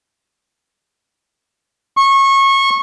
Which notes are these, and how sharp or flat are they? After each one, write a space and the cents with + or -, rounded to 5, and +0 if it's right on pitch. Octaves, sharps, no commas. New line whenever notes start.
C#6 -25